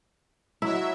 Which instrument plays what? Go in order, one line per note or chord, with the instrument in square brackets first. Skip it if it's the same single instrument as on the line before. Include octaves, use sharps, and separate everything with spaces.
[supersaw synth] F#3 E5 [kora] E4